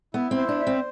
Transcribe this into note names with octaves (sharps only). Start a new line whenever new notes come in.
B3 E4
C4
C5
D4
E5
C4